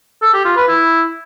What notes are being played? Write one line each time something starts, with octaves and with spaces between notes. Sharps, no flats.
A4
G4
F4
B4
E4